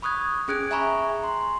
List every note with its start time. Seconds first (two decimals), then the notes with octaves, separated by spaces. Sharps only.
0.02 B5 C#6 D#6 F#6 G#6
0.48 C#4 G#4 F#6 G#6 D7
0.71 E5 G#5 A#5 B5 C#6
1.24 C6